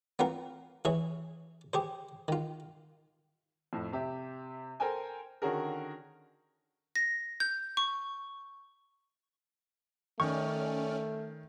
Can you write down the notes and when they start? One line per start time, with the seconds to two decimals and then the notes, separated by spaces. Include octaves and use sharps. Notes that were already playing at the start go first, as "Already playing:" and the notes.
0.19 B3 C4 F4 A#4
0.85 E3 G#4 C#5 E5
1.73 G4 G#4 C5
2.28 D#3 F4
3.73 F2 A2
3.92 C3 G4 E5
4.80 A4 A#4 C5 G5 G#5
5.42 D3 D#3 C#4 F#4 G#4 A#4
6.96 A#6
7.40 G6
7.77 C#6
10.20 D#3 A3 C#4 D5 C#6 F6